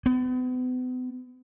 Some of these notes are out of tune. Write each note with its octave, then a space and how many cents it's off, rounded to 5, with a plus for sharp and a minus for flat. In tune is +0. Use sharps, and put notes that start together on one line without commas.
B3 +40